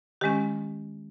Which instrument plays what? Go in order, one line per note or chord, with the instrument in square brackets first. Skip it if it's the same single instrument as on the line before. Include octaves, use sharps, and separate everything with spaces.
[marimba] D#3 G#3 C#4 G4